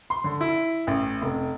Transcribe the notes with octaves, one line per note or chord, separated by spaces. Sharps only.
C6
D3
E4
A1
F1